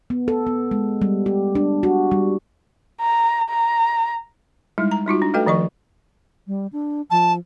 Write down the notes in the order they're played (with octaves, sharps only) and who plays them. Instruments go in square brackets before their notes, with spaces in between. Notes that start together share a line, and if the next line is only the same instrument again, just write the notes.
[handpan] B3
A4
B3
G#3
G3
G4
D4
F#4
G3
[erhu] A#5
A#5
[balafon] G3 G#3 D#4 E4
A#5
G3 D#4 F4 F#4
D4
A3 F#4 A4 B4 D#5 G5
D#3 F3 D#5 C#6
[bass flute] G3
D4
[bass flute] F3 [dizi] A5